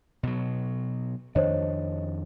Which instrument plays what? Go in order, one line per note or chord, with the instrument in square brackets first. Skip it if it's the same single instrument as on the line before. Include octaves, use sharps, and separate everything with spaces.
[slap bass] B2 F#3
[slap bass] F2 D#3 D4 [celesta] C5 C#5 D#5